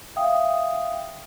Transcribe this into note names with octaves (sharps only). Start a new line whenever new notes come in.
E5 F5 G5 D#6